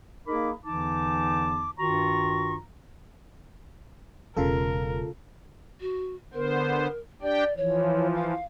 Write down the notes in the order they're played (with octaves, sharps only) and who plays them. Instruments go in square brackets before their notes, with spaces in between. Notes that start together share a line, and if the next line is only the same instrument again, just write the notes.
[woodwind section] A#3 D#4 G#4 A#4 B5 D6
E2 D3 E3 D#4 A5 D6
G2 D#3 F4 F#4 A#5 C#6
[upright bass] E1 [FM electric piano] C#3 F4 A4 [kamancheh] A#4
[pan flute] F#4
[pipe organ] D3 B3 C5 [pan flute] A#4
[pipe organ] D4 G4 G5 [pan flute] D5
[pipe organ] E3 F3 [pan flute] C#5
[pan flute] F5